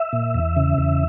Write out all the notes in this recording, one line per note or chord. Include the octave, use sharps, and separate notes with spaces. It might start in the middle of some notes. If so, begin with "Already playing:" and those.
Already playing: E5
A#2
E2
C#3
E2